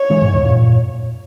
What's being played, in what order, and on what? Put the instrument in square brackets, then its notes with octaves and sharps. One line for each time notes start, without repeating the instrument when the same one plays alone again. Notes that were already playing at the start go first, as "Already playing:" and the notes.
Already playing: [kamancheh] C#5
[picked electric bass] E3 G#3
G#2 B2
E2 G#2
F#2 A#2